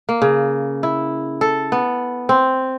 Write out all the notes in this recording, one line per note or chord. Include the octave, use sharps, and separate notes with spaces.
A#3
C#3
E4
A4
B3
C4